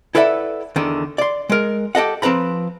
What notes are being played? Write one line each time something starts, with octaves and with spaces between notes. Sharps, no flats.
E4 A4 B4 D5 E5 F#5
E2 D3 D#3
D5 C6
G#3 A#4
G4 A4 D#5 F#5
F3 C4 B4 A#5 B5